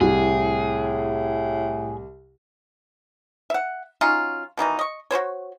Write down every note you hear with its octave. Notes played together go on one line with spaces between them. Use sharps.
C2 A2 G#4
E5 F#5
F#3 C#4 D#4 F4
B2 D#3 E3 D#4
D#5 C#6
F#4 G4 C5 C#5